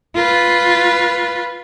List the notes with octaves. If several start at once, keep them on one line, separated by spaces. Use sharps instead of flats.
F4 B4